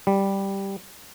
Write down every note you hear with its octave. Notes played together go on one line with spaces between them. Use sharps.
G3